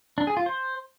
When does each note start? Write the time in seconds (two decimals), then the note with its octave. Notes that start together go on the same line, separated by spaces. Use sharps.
0.18 D4
0.27 G#4
0.37 F4
0.46 C5